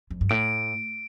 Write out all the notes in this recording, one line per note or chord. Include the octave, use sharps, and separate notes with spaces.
F2
G2
A2 D7